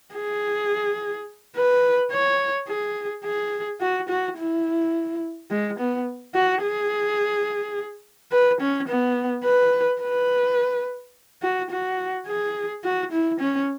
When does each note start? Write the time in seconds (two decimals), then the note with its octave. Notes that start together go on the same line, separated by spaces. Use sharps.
0.15 G#4
1.56 B4
2.12 C#5
2.68 G#4
3.24 G#4
3.81 F#4
4.09 F#4
4.38 E4
5.51 G#3
5.79 B3
6.35 F#4
6.63 G#4
8.32 B4
8.61 C#4
8.88 B3
9.45 B4
10.02 B4
11.43 F#4
11.71 F#4
12.27 G#4
12.84 F#4
13.12 E4
13.40 C#4